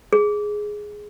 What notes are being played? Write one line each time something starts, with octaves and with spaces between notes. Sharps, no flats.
G#4